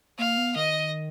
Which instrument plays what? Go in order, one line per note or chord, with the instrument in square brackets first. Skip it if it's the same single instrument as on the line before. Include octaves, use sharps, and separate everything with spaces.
[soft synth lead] A#3 [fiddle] F5
[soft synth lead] B3
[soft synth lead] D#3 [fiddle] D#5